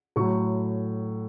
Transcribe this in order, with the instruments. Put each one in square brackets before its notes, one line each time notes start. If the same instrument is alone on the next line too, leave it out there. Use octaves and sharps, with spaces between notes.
[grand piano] A2 F#3 C#6